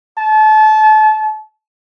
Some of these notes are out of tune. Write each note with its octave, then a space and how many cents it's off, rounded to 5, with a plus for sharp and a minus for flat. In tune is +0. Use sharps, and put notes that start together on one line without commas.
A5 -30